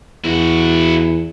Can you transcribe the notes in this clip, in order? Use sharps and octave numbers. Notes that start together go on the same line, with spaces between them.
E2 E4 F#4